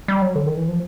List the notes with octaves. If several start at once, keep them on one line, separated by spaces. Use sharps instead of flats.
G3
F#3
D3
D#3
E3
F3